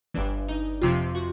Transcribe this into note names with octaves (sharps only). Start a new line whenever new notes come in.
G1 G2 E3 D4
D#4
F2 C3 F3 F4
F#4